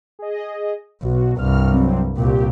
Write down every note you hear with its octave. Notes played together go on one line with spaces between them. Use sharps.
G#4 D#5
B1 B2 F#4
C2 G2 F6
F#3 C4
C2 A#2 G4